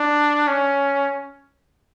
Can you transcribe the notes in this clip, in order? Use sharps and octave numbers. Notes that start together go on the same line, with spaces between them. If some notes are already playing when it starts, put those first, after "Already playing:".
Already playing: D4
C#4